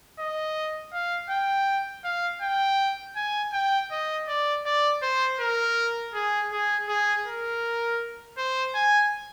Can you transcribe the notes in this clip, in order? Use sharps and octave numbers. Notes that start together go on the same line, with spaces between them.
D#5
F5
G5
F5
G5
G#5
G5
D#5
D5
D5
C5
A#4
G#4
G#4
G#4
A#4
C5
G#5